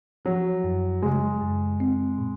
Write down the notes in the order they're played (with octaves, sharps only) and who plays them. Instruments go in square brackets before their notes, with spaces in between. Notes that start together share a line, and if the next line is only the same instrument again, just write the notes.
[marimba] F3 [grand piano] F#3
[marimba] F#2
[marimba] C#3 [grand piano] G#3
[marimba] F#2
C4
A#2